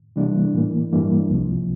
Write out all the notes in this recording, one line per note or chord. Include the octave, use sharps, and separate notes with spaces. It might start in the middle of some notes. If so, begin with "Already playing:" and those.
C3 E3 G3 A#3 D4
A2 E3 A#3
G2 E3 G3 A#3 D4
C2 C3 F3